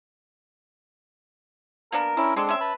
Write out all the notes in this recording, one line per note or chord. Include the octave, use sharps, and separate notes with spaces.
A#3 B3 D4 A#4
C#4 D4 E4
G#3 C4 D4 G#4 A4
C#4 E5
B4 A5 B5